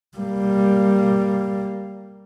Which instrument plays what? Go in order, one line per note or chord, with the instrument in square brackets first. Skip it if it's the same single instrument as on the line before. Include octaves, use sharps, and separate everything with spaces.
[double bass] G3 A#3